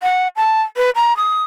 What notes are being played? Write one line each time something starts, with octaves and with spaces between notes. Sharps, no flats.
F#5
A5
B4
A#5
D#6